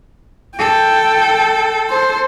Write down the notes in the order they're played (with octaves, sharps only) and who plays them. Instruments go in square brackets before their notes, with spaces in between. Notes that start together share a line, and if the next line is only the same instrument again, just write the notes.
[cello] A4 [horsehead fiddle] G5
[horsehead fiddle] C5